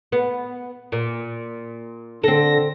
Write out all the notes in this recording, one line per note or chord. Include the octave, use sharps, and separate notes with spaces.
B3
A#2
D3 C4 A4 A#6